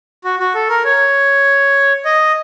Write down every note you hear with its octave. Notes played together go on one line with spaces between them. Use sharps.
F#4
F#4
A4
A#4
C#5
D#5